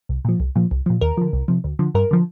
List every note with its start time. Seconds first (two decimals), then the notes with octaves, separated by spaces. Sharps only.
0.09 C2
0.25 A#2 F3
0.40 C2
0.55 A#2 F3
0.71 C2
0.86 A#2 F3
1.01 D#2 A#4
1.17 D3 F3
1.33 C2
1.48 C3 F3
1.64 D2
1.79 D3 F3
1.94 G2 A#4
2.11 D3 F3